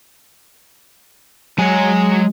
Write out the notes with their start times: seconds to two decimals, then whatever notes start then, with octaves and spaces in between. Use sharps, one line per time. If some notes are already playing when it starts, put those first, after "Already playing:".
1.58 F#3 G#3 C#5 G#5